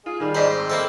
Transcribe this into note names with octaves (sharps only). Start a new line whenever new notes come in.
F4 G#4
D#3 G3 G#4
G#2 C5 D5 A#5
C4
A#3 C4 E4 A4